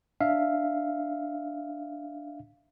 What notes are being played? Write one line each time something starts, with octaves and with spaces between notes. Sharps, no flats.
D4 E5 F5